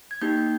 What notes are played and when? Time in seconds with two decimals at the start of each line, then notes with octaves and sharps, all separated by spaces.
0.11 G#6
0.21 A#3 D#4 G4 G6